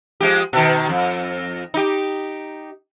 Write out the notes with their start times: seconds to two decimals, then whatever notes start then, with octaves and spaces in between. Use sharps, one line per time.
0.20 F3 G#3 G4
0.53 B2 D#3
0.89 F2
1.74 D#4 G4